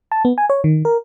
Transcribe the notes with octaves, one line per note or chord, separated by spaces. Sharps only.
A5
B3
G#5
C#5
D#3
A#4